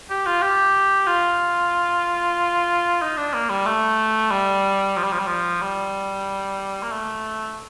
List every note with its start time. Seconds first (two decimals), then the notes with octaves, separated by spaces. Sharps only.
0.10 G4
0.26 F4
0.42 G4
1.07 F4
3.02 D#4
3.17 D4
3.34 A#3
3.50 G3
3.66 A3
4.31 G3
4.97 F3
5.03 G3
5.12 F3
5.19 G3
5.27 F3
5.62 G3
6.82 A#3
6.91 A3